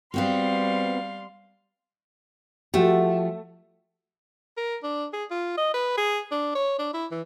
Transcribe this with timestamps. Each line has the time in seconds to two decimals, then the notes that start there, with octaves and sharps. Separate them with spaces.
0.14 G3 B3 C4 F#4 F5 C6
2.74 F3 A3 F#4 G4
4.57 A#4
4.83 D4
5.13 G#4
5.31 F4
5.57 D#5
5.74 B4
5.97 G#4
6.31 D4
6.55 C#5
6.79 D4
6.94 E4
7.11 E3